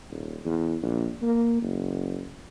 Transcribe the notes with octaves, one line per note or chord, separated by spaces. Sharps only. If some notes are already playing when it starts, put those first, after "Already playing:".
D#1
E2
A#1
A#3
F#1